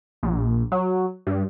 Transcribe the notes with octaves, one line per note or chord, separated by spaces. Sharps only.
A#1
F#3
G2